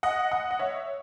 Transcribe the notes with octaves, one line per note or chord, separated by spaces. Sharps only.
D#5 F#5
D#5 F#5
D#5
C#5 E5